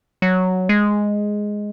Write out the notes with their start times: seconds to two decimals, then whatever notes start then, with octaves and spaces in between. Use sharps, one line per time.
0.22 F#3
0.69 G#3